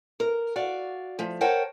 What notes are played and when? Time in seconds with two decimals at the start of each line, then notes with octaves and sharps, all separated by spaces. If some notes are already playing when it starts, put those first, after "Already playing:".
0.20 A#4
0.56 F#4 D5 F5
1.19 F3 A3
1.41 A#4 C5 C#5 F#5 G5 A5